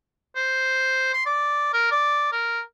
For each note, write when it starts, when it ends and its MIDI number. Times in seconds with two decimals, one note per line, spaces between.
0.36 1.09 72
1.14 1.23 84
1.26 1.72 74
1.73 1.87 70
1.91 2.30 74
2.32 2.60 70